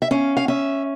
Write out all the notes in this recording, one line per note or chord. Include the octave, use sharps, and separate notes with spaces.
E5
C#4 F5
F5
C#4 E5